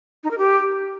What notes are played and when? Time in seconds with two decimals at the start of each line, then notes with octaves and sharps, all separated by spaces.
0.24 D#4
0.31 A#4
0.38 G4